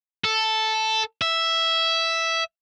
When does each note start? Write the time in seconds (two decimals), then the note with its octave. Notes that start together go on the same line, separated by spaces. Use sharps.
0.25 A4
1.22 E5